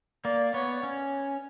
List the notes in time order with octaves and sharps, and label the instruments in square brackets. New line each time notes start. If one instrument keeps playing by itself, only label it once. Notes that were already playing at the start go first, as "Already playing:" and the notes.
[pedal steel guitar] A#3 [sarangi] D5
[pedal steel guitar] B3 [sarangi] C#5
[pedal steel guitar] C#4